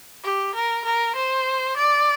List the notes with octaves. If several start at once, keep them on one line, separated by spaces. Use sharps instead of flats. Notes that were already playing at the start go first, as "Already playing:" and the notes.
G4
A#4
A#4
C5
D5